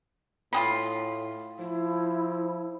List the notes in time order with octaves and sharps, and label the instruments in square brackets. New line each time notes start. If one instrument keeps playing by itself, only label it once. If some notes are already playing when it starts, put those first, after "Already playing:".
[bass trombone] A2 [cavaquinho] F4 G#4 B5
[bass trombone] F3 [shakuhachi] E4